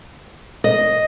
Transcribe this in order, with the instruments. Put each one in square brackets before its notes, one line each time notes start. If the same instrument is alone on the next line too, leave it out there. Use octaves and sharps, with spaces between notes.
[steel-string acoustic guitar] D#5